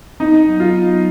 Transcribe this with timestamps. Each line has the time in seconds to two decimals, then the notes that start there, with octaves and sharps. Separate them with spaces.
0.20 B3 D#4
0.47 F#3
0.60 F4
0.73 B3